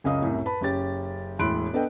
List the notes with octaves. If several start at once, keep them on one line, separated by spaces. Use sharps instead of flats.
C#2 F#2 C#3 D#5 F5 D#6
C2 F#2 A2
B4 A5 B5
F#1 C#4 G4 A6
E1 A2 B5 C6 F#6 D7
B3 D4 A4 B4 D#5 G5